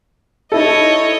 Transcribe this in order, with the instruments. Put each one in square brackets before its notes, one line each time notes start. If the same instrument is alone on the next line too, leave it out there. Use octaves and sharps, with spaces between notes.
[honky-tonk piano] D#4 E4 A4 [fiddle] C#5 D#5